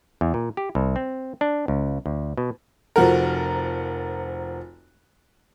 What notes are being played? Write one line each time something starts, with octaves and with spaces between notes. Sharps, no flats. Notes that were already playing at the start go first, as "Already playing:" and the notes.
E2
A#2
G4
C2
C4
D4
C#2
D2
B2
F1 F3 F#4 A#4